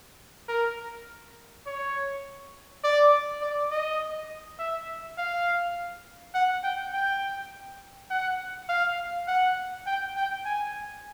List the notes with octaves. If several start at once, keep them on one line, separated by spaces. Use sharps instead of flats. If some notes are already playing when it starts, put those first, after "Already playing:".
A#4
C#5
D5
D5
D#5
E5
F5
F#5
G5
G5
F#5
F5
F#5
G5
G5
G#5